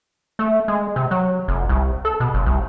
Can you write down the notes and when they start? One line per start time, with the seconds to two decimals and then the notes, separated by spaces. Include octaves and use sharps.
0.39 A3
0.68 G#3
0.96 C3
1.11 F#3
1.48 F1
1.69 C2
2.05 A4
2.20 B2
2.34 F#1
2.46 C2